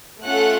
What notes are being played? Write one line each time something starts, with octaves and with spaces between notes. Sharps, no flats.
A3 C#4 F4 A4 F#5 F#6